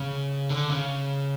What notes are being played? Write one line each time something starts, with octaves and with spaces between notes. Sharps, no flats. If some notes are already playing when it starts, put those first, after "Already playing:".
Already playing: C#3
D3
C#3